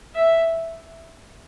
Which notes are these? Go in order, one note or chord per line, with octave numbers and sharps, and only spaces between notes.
E5